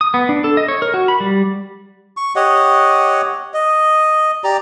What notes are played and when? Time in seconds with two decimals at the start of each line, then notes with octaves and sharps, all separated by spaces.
0.01 D#6
0.14 B3
0.29 D4
0.44 A4
0.57 D#5
0.68 C#5
0.82 A#4
0.94 F#4
1.08 B5
1.20 G3
2.17 C#6
2.36 G4 C#5 D#5 F#5
3.54 D#5
4.44 G4 D5 A#5